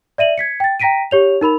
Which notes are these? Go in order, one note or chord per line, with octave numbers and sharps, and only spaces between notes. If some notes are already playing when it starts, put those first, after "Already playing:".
D5 E5 D#7 F#7
G#6 B6 C#7
G5 A6
G5 A#5 A#6 B6 D7 D#7
G4 C#5 F7
D#4 A#4 B5 F7